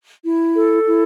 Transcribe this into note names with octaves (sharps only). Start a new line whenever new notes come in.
E4
A4
E4